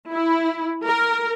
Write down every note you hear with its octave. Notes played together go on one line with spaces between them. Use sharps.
E4
A#4